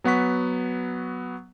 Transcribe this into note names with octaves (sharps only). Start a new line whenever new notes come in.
F#3 B3 F#5 C#6 B6